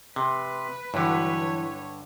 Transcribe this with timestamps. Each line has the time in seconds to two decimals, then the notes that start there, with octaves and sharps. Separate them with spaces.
0.16 C3 B4
0.94 G2 D3 E3 F#3 C#5